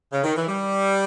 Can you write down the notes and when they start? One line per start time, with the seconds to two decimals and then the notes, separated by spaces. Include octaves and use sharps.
0.13 C#3
0.24 D#3
0.36 E3
0.47 G3